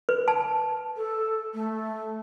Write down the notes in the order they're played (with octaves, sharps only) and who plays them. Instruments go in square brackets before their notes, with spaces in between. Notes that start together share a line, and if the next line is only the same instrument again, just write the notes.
[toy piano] B4
A5
[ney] A4
A3